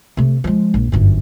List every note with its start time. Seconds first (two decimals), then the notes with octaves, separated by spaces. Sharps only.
0.17 C3 A3
0.44 F3 G#3
0.74 A#1
0.92 G1 F#2